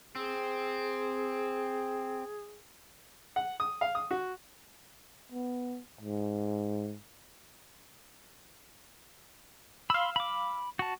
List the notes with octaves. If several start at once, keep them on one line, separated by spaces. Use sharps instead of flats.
C4 G#4
F#5
D#6
F5
D#6
F#4
B3
G#2
F5 B5 C6 E6
B5 D6
F#4 A5